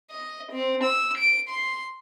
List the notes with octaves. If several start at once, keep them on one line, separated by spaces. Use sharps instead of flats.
D#5
C4
E6
D7
C6